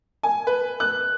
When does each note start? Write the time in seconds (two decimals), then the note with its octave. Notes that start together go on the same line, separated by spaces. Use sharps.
0.23 G#5
0.47 B4
0.80 F#6